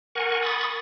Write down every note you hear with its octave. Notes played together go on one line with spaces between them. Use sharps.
A#4 F#5 G#5 C#6
B5 C#6 D#6 A6